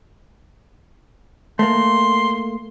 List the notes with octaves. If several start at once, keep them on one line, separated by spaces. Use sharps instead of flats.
A3 A#3 C6